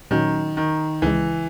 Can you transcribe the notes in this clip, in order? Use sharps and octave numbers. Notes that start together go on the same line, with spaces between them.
A#2 D#3 F#3 C#4 F#4
D#3
C#2 C#3 E3 G#3